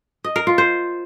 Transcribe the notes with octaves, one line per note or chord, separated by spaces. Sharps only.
D#5
A#4
F4
C5